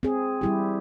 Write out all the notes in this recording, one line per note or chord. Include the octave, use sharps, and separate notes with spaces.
C4 G#4
G3 E4 G4